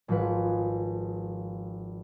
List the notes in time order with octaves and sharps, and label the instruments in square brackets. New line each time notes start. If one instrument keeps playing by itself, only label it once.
[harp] G#1 F3 G#3 B4